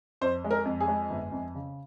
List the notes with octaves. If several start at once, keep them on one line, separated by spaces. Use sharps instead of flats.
F2 C5
G#3
A#4
F2
G#4
G#3
G1
F2
C#3